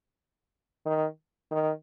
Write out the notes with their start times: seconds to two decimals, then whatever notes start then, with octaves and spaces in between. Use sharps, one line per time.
0.86 D#3
1.51 D#3